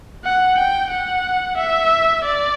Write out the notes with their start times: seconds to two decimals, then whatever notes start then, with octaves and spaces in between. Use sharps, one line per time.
0.24 F#5
0.58 G5
0.91 F#5
1.57 E5
2.24 D5